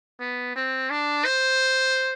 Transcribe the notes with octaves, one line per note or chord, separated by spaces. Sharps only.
B3
C4
D4
C5